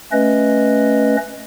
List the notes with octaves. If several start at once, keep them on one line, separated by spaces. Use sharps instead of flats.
A3 C#4 B4 D#5